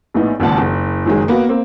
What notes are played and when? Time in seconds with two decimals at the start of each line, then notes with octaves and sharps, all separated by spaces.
0.14 A#1 A2 B3 D#4
0.40 G#1 C#2 A#2 F#5 A5
0.58 F#1
1.06 F#1 D#3 F#3 G#3
1.28 A#3 B3 F#4
1.49 A#3 C4